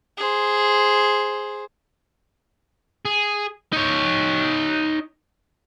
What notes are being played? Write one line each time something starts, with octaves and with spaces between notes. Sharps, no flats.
G#4 C5
G#4
D#4 C#5